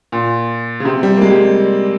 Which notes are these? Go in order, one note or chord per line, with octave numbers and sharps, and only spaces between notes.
A#2
C#3
C3
G3
A#3
G#3
G3